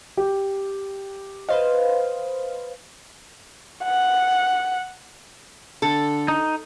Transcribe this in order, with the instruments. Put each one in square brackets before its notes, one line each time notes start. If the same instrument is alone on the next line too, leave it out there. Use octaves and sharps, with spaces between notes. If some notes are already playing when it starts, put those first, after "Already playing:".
[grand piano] G4
[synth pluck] B4 C5 F5 [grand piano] D#5
[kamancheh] F#5
[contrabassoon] D3 [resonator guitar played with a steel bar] A4
[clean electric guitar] D#4